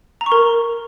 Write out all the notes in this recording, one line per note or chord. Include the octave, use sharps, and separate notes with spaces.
A#5
C#6
A#4